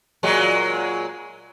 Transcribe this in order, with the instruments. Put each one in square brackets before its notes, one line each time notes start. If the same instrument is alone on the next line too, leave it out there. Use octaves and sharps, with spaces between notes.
[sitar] A#2 F#3 G#3